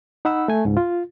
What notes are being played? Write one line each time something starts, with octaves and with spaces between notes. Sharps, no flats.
D#4 F#5 B5 E6
A3 G#5
C#2 G#2
F4